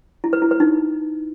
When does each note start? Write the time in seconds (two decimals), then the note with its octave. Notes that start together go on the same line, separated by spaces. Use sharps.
0.24 E4
0.33 B4
0.42 E4
0.51 B4
0.60 D#4